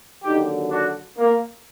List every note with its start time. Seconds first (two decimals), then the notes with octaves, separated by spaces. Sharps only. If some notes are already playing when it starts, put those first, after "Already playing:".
0.23 D#2 D3 F#3 D#4 G4
0.71 D4 F#4
1.18 A#3